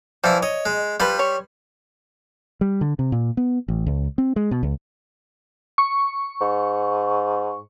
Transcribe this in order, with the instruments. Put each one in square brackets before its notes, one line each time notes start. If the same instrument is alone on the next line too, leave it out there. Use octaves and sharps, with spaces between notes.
[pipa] E3 G3 [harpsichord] F3 E4
[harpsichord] C#5 [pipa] D#5
[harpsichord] G#3
[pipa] F3 B4 [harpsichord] G3 B5 C6
[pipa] C#5
[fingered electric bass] G3
D3
C3
A#2
B3
A1
C#2
C4
G#3
B2
C#2
[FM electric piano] C#6
[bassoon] G#2